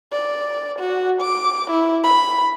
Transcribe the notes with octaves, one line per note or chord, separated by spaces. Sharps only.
D5
F#4
D6
E4
B5